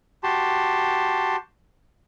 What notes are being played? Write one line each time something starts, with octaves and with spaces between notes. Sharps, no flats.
F#4 G4 A5 C6